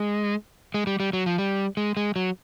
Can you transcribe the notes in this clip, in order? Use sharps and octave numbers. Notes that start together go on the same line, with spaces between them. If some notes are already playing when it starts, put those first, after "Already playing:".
Already playing: G#3
G#3
G3
G3
F#3
F3
G3
G#3
G#3
F#3